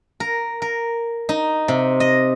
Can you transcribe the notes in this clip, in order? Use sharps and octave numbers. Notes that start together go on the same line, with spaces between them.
A#4
A#4
D#4
C3
D#5